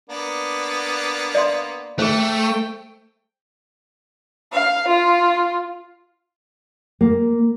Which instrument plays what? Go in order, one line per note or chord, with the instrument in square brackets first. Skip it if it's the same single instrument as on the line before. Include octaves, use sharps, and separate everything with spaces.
[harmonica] A#3 B3 D4
[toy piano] D5 F5 C6
[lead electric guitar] A3 [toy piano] G#4 C5 [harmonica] G5
[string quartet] F5
F4
[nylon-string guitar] A#3